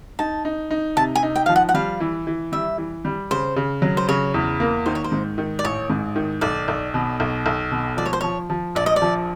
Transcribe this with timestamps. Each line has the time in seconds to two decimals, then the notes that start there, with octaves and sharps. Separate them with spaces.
0.19 D#4 A5
0.45 D#4
0.71 D#4
0.96 C3 A5
1.15 G#5
1.23 D#4
1.36 G5
1.46 F3 F5
1.56 F#5
1.69 F#5
1.74 G3 F5
2.00 E3
2.27 E3
2.52 G3 E5
2.78 E3
3.05 G3
3.31 C#3 C5
3.56 C#3
3.82 F#3
3.97 C5
4.08 C#3 C#5
4.34 E2
4.60 A#3
4.86 D#3 C5
4.95 C#5
5.04 C5
5.12 G#2
5.38 D#3
5.59 D5
5.64 A1 C#5
5.90 G#2
6.16 D#3
6.41 B1 D5
6.68 B1
6.94 B2
7.20 B1
7.46 B1
7.72 B2
7.97 F3 D5
8.06 C#5
8.13 C5
8.21 F3 C#5
8.50 F3
8.75 A#1 D5
8.86 D#5
8.96 D5
9.02 F3